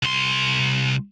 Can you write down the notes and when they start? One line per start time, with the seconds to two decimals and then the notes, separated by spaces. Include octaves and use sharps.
0.03 C2 C6